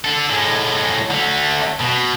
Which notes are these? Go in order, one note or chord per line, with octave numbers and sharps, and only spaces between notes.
D4 A4
A2 G#3
D3 A3
B2